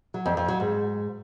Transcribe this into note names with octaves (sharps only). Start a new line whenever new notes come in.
F#3
F2
F2
F#3
G#2